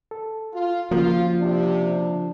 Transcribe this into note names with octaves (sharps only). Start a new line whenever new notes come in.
A4
F4
C#3 F3 A#3 F4 F#4
C3 D4